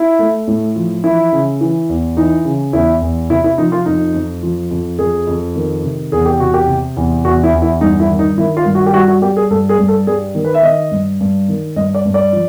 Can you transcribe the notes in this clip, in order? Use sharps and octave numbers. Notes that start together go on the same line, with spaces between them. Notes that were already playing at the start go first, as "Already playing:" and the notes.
Already playing: E4
A3
A2
F3
E3 E4
C#3
E3
E2
E3 D#4
C#3
E2 E4
E2
C3 E4
E4
F3 D#4
F4
F2 D#4
F2
F3
F2
F2 G#4
F2
D#3
C3
E2 G#4
G4
C3 F#4
G4
C3
E2
E2 F#4
E4
E2
E4
G2 D#4
E4
D#3
D#4
D#3 E4
F4
G2
F#4
G4
G3 F#4
F#4
G3 G4
G#4
G2 A4
G#4
G2
A4
G3 G#4
D#3
B4
E5
D#3 D#5
G2
G2
D#3
G2 D#5
D5
G2
D5
F3